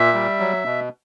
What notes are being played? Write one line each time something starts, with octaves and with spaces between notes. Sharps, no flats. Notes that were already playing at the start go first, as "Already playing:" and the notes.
Already playing: A#2 E5
G3
F#3
B2